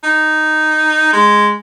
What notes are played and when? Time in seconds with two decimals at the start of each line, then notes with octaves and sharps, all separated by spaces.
0.03 D#4
1.13 G#3